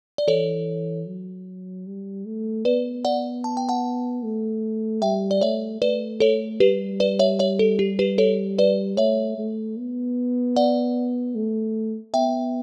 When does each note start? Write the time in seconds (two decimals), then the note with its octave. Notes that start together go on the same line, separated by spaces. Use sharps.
0.18 D5
0.28 E3 A4 C#5
1.06 F#3
1.87 G3
2.25 A3
2.65 B3 B4 D5
3.05 D5 F#5
3.44 A5
3.57 G5
3.69 F#5 A5
4.24 A3
5.02 G3 E5 G5
5.31 D5
5.41 A3 C#5 E5
5.82 A3 B4 D5
6.20 A4 C#5
6.60 G3 G4 B4
7.00 B4 D5
7.19 C#5 E5
7.39 C#5 E5
7.59 A4
7.79 G4
7.99 G4 B4
8.18 A4 C#5
8.58 B4 D5
8.97 A3 C#5 E5
9.38 A3
9.77 B3
10.56 D5 F#5
11.35 A3
12.14 B3 E5 G5